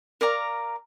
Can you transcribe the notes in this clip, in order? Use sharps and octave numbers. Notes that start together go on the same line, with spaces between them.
A#4 D5 F5 A#5